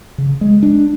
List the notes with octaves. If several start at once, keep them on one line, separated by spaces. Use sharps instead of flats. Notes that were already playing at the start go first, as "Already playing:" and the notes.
C#3
G#3
D4